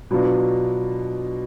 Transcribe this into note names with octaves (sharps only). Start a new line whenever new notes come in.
B2 F#3 D4 F4